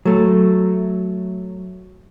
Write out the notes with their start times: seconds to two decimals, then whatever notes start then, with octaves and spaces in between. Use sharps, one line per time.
0.05 F#3 A3